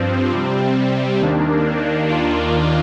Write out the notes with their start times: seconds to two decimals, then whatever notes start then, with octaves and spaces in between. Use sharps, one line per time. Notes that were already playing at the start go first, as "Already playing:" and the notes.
Already playing: G2 F3 C4
0.32 C3 G3 C4
1.20 D#2 D#3 A#3 D4
2.08 D#2 D#3 A#3 D4 F4